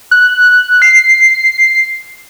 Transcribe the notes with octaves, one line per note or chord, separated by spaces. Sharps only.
F#6
C7